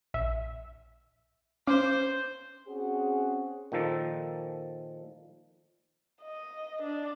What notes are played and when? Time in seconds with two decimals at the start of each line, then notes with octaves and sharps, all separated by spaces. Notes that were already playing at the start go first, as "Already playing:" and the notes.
0.14 A#1 E5 E6
1.67 C#4 C5 F5 D6
2.67 C4 C#4 F#4 G#4
3.72 A#2 D#3 F3 A4
6.22 D#5
6.82 D4